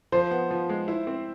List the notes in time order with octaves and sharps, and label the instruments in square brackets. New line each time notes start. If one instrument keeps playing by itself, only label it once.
[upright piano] F3 [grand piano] C5
[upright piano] B3
F3
G#3
E4
C4